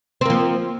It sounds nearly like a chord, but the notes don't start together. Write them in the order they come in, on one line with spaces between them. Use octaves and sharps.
C4 A#3 F3